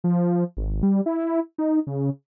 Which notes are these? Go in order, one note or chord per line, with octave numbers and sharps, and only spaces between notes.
F3
G#1
G3
E4
D#4
C#3